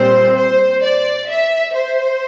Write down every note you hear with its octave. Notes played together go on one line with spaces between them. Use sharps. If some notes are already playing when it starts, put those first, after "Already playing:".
Already playing: A#2 G3 C4 C5
C5
D5
E5
C5